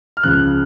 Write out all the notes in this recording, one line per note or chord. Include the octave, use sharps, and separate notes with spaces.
F6
C#2 C#3 F3 F#6